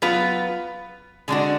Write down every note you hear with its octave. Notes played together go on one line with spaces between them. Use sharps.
F#3 B3 F4 B4
D3 G#3 D4 F#4